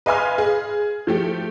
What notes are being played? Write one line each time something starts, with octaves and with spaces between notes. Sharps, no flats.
B4 D#5 F5 G#5 C6 F6
G#4
F3 A3 G4